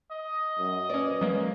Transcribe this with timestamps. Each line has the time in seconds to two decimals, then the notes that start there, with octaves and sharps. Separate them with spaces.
0.12 D#5
0.58 F#2
0.90 C#4 B4 D5
1.21 F#3 G#3 A#3